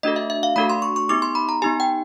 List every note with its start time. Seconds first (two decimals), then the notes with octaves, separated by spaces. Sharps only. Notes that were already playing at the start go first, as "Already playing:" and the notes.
0.03 A3 D4 F#4 A4 D#5
0.16 E5
0.30 E5
0.43 F5
0.56 A3 D4 F#4 A4 B5
0.70 C6
0.82 C#6
0.96 C#6
1.09 B3 D#4 G4 D6
1.22 C6
1.35 B5
1.49 A#5
1.62 B3 D#4 G4 G#5
1.80 G5